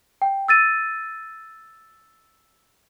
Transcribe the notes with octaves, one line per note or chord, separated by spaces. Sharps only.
G5
E6 A6 D#7